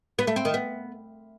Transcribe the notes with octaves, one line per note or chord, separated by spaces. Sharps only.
B3
A3
C4
D#3
B3